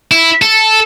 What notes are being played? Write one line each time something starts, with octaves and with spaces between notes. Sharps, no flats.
E4
A4